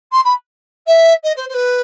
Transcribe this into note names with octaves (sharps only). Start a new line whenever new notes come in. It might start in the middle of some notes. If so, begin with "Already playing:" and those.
C6
B5
E5
D#5
C5
C5
B4